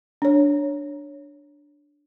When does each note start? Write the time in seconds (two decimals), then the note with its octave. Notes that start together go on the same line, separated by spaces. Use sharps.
0.22 D4 C#5